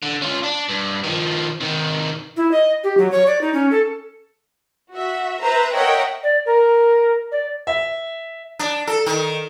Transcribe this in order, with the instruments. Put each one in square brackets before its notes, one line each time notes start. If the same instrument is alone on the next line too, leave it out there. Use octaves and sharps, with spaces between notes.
[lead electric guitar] D3
C#4 F4
D4
G2
D#3 F3
C3 D#3
[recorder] E4
D#5
G4
F#3
C#5
D5
D#4
C#4
A4
[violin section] F#4 E5
B4 C5 E5 A#5
A#4 C#5 D#5 E5 F#5 G5
[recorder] D5
A#4
D5
[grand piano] E5
[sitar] D4
A4
D#3